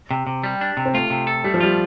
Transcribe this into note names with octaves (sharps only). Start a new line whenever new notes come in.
C3
C3
G3
D4
C3
C4
A3 F4
C3
A4
G3 A3
F3
G3 F4